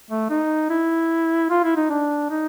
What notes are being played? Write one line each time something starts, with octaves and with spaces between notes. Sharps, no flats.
A3
D#4
E4
F4
E4
D#4
D4
D#4